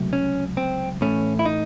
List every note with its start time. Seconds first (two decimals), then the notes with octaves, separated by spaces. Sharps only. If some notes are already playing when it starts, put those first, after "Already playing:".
Already playing: C#2 C3 F#3 A3
0.13 C#4
0.57 C4
1.01 A2 E3 A3 C#4
1.39 E4
1.45 D#4